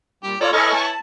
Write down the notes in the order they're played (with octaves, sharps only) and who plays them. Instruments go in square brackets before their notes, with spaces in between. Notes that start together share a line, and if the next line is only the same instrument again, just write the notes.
[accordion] A#2 G3 [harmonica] G4
[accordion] F4 C#5 [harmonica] A4 A#5 [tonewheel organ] D5
[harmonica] E4 B4 C#5 [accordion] A4 D#5 F6 [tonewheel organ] G#5 C#6
[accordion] A5